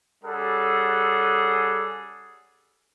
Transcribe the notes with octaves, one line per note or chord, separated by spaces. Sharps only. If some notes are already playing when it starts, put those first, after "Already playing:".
G3 C#4 G#4 A4 F#5